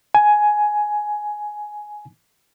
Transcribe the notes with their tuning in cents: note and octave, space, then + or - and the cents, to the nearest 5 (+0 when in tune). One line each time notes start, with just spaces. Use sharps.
G#5 +10